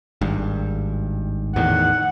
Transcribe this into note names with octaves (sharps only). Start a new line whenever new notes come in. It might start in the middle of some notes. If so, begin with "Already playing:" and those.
G#1 G2
E2 A2 D#3 F#5